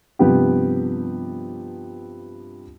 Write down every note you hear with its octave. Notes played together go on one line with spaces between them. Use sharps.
G2 C3 F3 B3 G4